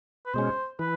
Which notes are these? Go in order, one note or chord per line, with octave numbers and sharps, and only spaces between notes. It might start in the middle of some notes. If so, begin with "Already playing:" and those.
B4
B2 G#3 C#4 C5
E3 B4